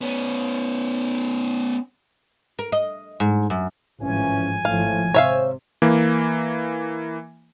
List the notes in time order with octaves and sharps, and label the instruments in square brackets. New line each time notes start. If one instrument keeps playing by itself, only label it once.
[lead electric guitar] B3 C#4
[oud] A#4
D#5
G#2
F#2
[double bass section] G#1 A2 F3 [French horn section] E3 C#4 [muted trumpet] G#5
[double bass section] G#1 F3 [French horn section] A2 [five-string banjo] F5
[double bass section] C3 [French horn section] C5 [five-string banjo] C#5 E5 F5
[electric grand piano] E3 A#3